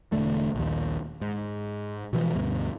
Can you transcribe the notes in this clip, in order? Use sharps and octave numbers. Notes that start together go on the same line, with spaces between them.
E1 D#2 D3 A3
A#1 D#2
G#2
B2 E3 F3
D2 G2 B2